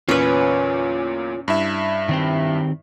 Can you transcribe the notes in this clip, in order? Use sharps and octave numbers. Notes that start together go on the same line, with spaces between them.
E2 A#2 C#4 F4 B4 C#5
G2 E4 E5
D#3 C4 G4